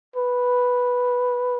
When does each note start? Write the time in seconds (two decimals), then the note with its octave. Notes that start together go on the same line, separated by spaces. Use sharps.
0.16 B4